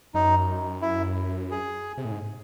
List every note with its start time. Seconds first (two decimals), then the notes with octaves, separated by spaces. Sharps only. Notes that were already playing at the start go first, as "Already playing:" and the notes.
0.14 F#2 D#4
0.82 E4
1.51 G#4
1.98 C3
2.05 A2
2.12 G#2